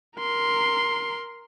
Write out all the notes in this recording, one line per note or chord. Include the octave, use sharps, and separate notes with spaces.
A#4 C6